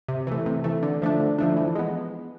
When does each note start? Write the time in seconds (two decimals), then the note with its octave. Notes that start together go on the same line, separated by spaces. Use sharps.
0.08 C3
0.27 E3 A3
0.46 C3
0.64 E3 A3
0.83 D3
1.02 F3 A3 D4
1.20 D3
1.39 F3 A3 D4
1.57 E3
1.76 G#3 B3